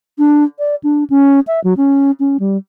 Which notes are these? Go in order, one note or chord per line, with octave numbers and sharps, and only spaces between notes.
D4
D5
D4
C#4
E5
F#3
C#4
C#4
G3